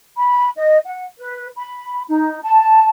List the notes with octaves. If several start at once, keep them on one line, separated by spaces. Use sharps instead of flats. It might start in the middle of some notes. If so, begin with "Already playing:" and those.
B5
D#5
F#5
B4
B5
D#4
A5